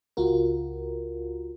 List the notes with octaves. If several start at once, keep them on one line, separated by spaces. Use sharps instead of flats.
C#2 F4 F#4 A#4